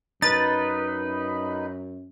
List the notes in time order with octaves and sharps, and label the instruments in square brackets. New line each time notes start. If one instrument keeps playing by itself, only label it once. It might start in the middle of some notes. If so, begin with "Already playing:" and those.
[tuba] F#2 [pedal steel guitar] D#4 B4 [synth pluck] A6